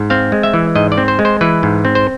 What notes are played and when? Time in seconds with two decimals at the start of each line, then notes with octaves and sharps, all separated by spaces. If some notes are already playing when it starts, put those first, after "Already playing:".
Already playing: G#2
0.10 C4 F5
0.32 G#3
0.43 E5
0.54 E3
0.75 G#2 D#5
0.92 D5
0.98 C4
1.08 C5
1.19 G#3
1.25 C5
1.41 E3 B4
1.63 G#2
1.85 C4
1.95 C5